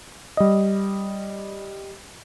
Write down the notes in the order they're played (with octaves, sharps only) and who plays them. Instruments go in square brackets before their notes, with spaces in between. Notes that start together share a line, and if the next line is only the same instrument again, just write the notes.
[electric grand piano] G3 D#5